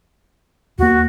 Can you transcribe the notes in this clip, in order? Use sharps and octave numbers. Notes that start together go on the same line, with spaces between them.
D#2 A#3 F#4